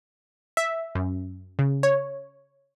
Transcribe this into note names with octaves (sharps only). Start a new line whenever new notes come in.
E5
F#2
C#3
C#5